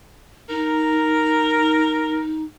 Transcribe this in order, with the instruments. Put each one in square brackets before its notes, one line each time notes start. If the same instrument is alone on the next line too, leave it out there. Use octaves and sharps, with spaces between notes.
[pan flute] D#4 [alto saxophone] A#4